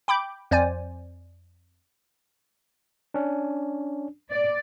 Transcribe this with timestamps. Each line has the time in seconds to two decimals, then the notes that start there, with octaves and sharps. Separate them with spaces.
0.08 G5 B5 D6 G6
0.51 F2 C5 D5 G#5
3.14 C#4 D4
4.30 D5